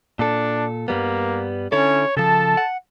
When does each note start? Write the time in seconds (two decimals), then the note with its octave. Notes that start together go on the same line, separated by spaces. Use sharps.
0.19 A#2 D4 A4
0.88 G2 G3 A#3 B3
1.72 D3 C#4 E4 A4 C#5
2.17 C#3 F3 A4 A5
2.57 F#5